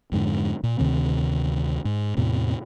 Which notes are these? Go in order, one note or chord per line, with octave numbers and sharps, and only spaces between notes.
F2 G#2 D3
A#2
D2 C3 D#3 C4
G#2
E2 A2 C3